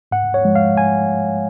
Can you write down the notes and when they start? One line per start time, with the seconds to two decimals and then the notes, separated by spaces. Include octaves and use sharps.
0.11 G#2 F#5
0.34 C#5
0.45 F3 G#3
0.55 F5
0.77 G#5